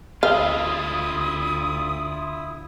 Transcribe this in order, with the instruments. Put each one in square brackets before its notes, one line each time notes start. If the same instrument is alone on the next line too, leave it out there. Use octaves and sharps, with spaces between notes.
[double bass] D2 [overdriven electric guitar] E4 F4 [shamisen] F5 [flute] D#6